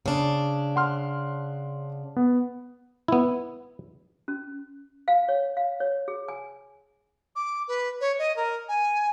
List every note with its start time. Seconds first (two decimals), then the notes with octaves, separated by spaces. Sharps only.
0.06 C#3 D4
0.76 F#5 C6 F6
2.16 B3
3.08 B3 E4
4.28 C#4
5.08 F5
5.29 C#5
5.57 F5
5.80 C#5
6.08 G#4
6.28 G#5
7.36 D6
7.68 B4
8.01 C#5
8.19 D#5
8.36 A#4
8.69 G#5